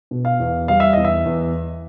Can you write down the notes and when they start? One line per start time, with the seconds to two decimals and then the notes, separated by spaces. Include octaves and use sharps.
0.11 B2
0.25 F5
0.40 E2
0.68 G3 F5
0.80 E5
0.93 E2 D#5
1.05 E5
1.25 E2